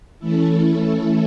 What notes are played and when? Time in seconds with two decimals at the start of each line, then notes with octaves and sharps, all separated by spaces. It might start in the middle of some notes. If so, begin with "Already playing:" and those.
0.19 E3 A3 C#4 E4 A4